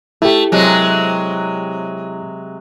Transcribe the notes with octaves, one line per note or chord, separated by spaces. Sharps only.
A3 E4 G4
C3 F#3 G#3